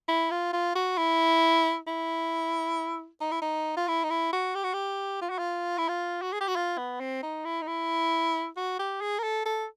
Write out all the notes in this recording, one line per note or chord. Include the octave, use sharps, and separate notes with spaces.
E4
F4
F4
F#4
E4
E4
D#4
E4
D#4
F4
E4
D#4
E4
F#4
G4
F#4
G4
F4
F#4
F4
E4
F4
F#4
G#4
G4
F#4
F4
B3
C4
D#4
E4
D#4
E4
F#4
G4
G#4
A#4
A4
A4